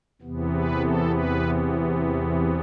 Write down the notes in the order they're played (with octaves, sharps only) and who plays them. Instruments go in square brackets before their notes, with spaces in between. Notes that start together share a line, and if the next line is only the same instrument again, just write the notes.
[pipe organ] E2 C3 E3 B3
B4
A4
B4